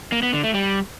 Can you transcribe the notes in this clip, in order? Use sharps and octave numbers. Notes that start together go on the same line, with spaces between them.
A#3
B3
D3
A3
G3